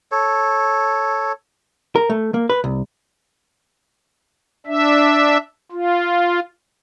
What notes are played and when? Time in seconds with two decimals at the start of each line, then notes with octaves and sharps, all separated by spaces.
0.11 A4 C#5
1.95 A#4
2.10 A3
2.34 A#3
2.50 B4
2.64 C2
4.66 D4 E5
5.72 F4